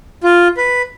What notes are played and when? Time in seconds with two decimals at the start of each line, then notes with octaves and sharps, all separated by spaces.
0.24 F4
0.57 B4